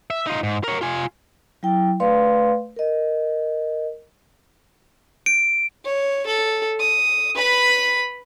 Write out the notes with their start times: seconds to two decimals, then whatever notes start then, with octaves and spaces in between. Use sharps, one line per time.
0.10 E5
0.26 D#4 F4
0.43 G#2
0.64 A#4 C#5
0.81 F4 G#5
1.63 F#3 E4 G5
2.00 A3 B4 D5 F5 C6
2.76 A#4 D#5
5.26 D7
5.85 C#5
6.26 A4
6.80 D#6
7.35 B4 B5